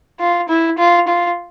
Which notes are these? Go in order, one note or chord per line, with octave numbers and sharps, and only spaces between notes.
F4
E4
F4
F4